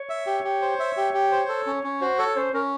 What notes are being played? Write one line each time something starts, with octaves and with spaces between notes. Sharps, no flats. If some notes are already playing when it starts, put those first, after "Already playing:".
Already playing: C#5
E5
G4
G4
C5
E5
G4
G4
C5
A4
C#4
C#4
F#4 C5
A4 C#5
C#4 C5
C#4 A#4